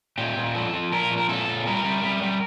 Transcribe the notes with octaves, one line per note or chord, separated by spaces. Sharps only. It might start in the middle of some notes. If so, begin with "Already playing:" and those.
A#2 G4
A#2
F3 A4
F3
A#2 A#4
F3
A#4
A#2 A4
A#2
G3 A#4
G3
G3
G3